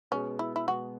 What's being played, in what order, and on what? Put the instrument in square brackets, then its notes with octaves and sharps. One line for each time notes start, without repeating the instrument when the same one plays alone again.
[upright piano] B2 G#3 B3 G#4 [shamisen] C#4
[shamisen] E4
E4
[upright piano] B2 G#3 B3 G#4 [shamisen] F#4